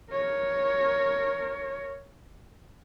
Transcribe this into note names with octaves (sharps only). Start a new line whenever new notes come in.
A#4 C#5